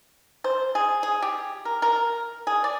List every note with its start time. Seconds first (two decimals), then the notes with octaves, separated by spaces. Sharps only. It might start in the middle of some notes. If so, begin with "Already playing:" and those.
0.44 C5
0.75 G#4
1.03 G#4
1.22 G4
1.65 A#4
1.82 A#4
2.47 G#4
2.64 D5